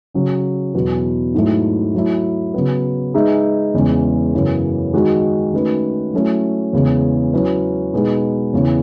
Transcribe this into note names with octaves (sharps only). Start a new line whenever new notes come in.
C#3 F#3 C#4
E2 B2 F#3 B3 F#4
G#2 F#3 A3 E4
F#3 A3 E4
C#3 F#3 B3
G#3 D#4 G#4 B4 E5
E2 C#3 G#3 C#4
F#2 C#3 E3 B3
D#3 G#3 D#4 F#4
D#3 A3 C#4 F#4 B4
F#3 A3 C#4 E4
E2 C#3 G#3
F#3 C#4 E4 B4
B2 G#3 B3 D#4 G#4
E2 C#3 E3